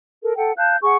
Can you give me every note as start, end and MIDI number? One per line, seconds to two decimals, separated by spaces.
0.23 0.33 69
0.23 0.33 70
0.37 0.51 69
0.37 0.51 78
0.37 0.51 79
0.57 0.77 77
0.57 0.77 81
0.57 0.77 90
0.57 0.77 91
0.82 0.97 68
0.82 0.97 78
0.82 0.97 85